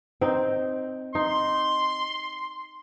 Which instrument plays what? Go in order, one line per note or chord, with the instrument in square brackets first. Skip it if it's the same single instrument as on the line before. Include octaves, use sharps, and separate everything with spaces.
[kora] C4 D#4
[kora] D#4 [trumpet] C6